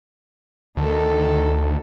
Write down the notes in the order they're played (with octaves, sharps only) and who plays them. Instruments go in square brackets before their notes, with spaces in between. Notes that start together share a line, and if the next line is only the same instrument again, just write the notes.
[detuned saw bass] D2 [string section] D#3 A4